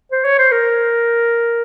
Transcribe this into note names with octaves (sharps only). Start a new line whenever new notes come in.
C5
C#5
C5
A#4